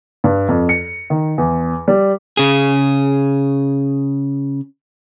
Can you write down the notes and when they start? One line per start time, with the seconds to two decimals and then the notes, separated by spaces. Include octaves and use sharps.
0.24 G2
0.49 F2
0.69 C#7
1.10 D#3
1.38 E2
1.88 G3
2.37 C#3 G#4